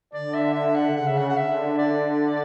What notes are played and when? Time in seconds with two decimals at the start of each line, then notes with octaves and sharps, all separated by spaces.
0.14 D3 D5
0.34 E5
0.54 E5
0.75 F#5
0.96 C#3 F#5
1.07 E5
1.18 F#5
1.29 F#5
1.37 D3 E5
1.78 D5